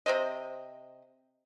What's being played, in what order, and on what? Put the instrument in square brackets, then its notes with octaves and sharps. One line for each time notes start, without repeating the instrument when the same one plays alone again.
[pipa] C3 A#3 C5 D#5